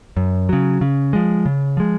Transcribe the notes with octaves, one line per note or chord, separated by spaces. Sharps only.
F#2
C#3 F#3
C#3
F3 G#3
C#3
F3 G#3